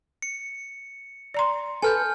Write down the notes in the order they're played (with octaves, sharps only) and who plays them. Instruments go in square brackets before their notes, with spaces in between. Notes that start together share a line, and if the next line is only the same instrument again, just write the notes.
[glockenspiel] C#7
[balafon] D5 A#5 C6
[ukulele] A4 B4 [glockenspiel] G#5 F6 G6